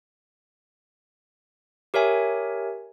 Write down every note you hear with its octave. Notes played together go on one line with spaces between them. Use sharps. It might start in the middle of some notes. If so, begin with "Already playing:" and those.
G4 A#4 C#5 E5 G#5